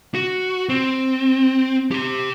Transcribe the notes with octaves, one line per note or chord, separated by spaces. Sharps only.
F#4
C4
G4 C6